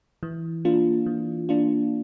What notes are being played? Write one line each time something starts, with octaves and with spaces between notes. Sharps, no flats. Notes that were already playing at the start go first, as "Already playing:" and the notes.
E3
A#3 D4 F4
E3
A#3 D4 F4